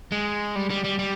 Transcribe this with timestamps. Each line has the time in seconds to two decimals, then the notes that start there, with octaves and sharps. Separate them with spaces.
0.12 G#3
0.55 G3
0.70 G3
0.84 G3
0.99 G3